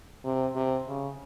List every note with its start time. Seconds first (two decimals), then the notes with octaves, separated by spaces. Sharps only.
0.24 C3
0.56 C3
0.87 C#3